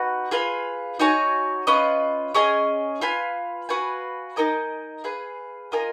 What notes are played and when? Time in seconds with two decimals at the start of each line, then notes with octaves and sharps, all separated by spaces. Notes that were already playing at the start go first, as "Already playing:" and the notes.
Already playing: D#4 F#4 B4 F#5
0.31 F4 G#4 B4 F5
0.99 D#4 F#4 C#5 G#5
1.67 C#4 F4 B4 D#5
2.34 C#4 G#4 D#5 G#5
3.01 F4 B4 F5 G#5
3.69 F#4 B4 F5 G#5
4.36 D#4 A#4 D#5 G#5
5.04 G#4 B4 F5
5.72 F4 A#4 D#5 G#5